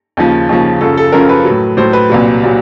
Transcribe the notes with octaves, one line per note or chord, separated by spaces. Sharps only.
D#2 C#3 F3
D#2 C#3 F3
F#2 C#3 F3 A4
A4
F#2 C#3 F3 A#4
B4
F#3
A2
A2 F#3 C5
B4
C2 A#2 F#3
A#2 F#3